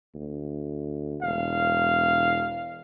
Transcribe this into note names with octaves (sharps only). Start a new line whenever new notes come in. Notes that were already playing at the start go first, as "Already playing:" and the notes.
D2
E1 F5